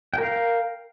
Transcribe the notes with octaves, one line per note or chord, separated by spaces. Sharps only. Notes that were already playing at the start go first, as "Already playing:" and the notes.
A#4 F5 G5